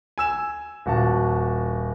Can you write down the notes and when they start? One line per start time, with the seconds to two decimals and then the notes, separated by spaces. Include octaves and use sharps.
0.18 G#5 E6 E7
0.86 D#1 F#4 A5